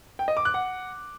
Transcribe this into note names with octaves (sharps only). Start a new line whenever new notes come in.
G5
D#5
D6
F#6
F#5